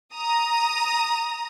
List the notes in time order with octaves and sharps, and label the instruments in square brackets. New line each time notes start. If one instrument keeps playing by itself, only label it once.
[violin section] A#5 D#6